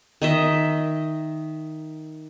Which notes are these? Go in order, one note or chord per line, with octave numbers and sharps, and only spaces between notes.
D#3 D#5 E5